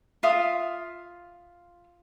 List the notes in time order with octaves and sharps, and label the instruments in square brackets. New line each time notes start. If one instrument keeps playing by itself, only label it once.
[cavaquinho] F4 E5 F5 D#6